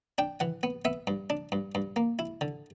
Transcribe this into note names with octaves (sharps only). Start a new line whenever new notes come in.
D4 G5
E3 F#5
B3
B3 E5
G2
D4
G2
G2
A#3
E4
D3